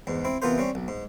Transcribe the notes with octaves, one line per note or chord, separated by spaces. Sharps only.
E2 G#2
C4 E4
C3 E3 B3 F4 A#4 C5
G3 C4 C#4
B1
G#2